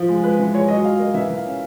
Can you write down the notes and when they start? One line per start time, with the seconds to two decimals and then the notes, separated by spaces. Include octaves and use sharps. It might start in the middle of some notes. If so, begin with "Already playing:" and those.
Already playing: F3
0.08 G#3
0.23 G#3 B4
0.39 E3
0.54 G#3 C#5
0.69 F#3 D#5
0.84 F#3 F5
0.99 A#3 D#5
1.14 E3 E5
1.30 E3
1.37 F5
1.45 C#4